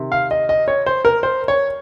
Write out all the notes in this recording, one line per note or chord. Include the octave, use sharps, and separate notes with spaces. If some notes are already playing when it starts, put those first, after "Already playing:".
Already playing: C3 D#3
F5
D#5
D#5
C#5
C5
A#4
C5
C#5